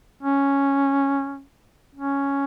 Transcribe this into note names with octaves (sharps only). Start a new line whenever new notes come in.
C#4
C#4